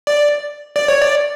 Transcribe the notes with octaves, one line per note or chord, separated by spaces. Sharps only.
D5
D5
C#5
D5